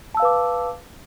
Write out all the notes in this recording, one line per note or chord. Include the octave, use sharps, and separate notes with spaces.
B4 F5 A5 D6 E6